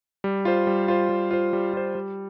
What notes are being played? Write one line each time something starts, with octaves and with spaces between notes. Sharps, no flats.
G3
F4 C5
G3
F4 C5
G3
F4 C5
G3
F4 C5
G3